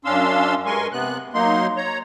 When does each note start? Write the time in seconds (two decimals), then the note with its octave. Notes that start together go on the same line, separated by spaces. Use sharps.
0.05 F#2 C#4 D4 F5 C6 E6
0.66 G2 G#3 A#4 G#5 C6 C#6
0.92 C3 B3 F#6
1.34 F#3 A#3 D#4 C6
1.77 C#5 A#5